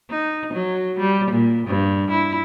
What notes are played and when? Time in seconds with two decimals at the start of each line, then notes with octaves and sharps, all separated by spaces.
0.10 D#4
0.54 F#3
0.99 G3
1.31 A#2
1.67 G2
2.11 E4